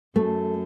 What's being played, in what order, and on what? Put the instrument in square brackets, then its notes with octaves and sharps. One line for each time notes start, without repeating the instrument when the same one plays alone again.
[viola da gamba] F#2 [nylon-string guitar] A3